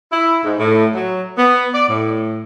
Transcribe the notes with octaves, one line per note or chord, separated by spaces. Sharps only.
E4
G#2
A2
F#3
B3
D5
A2